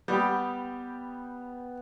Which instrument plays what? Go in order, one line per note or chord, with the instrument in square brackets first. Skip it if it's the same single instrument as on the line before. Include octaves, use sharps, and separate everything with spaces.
[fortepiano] G3 G4 [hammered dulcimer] B3 G5